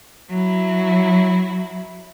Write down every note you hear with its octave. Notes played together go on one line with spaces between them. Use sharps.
F#3 E4